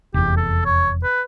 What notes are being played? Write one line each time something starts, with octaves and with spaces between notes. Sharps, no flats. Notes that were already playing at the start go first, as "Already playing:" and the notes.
F1 E2 G4
A4
C#5
B4